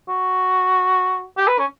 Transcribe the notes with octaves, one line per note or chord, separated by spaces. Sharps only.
F#4
G4
B4
C#4